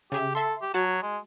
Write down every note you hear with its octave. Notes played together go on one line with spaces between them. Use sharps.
C#3 G4 G#4 E5
A4 E5 C6
G4
F#3 F#4 A5
G#3